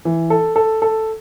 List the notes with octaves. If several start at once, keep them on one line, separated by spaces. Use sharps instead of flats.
E3
A4
A4
A4